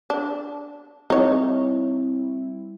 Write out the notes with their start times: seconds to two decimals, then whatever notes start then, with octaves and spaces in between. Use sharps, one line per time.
0.10 D4
1.10 G3 C4 D#4 E4 C#5